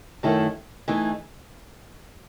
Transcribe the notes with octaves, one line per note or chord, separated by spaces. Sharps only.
F#2 D#3 A3 E4 A4
E3 A3 D#4 G#4